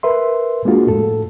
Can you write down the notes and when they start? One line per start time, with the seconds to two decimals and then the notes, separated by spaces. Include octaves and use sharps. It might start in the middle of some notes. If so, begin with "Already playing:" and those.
0.03 A#4 B4 E5 C6
0.65 G#3 A#3 D4 F4 F#4 G#4
0.87 F2 A2 A4